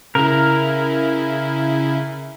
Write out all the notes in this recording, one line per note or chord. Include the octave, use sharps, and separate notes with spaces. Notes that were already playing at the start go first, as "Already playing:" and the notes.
C#3 E4 A#4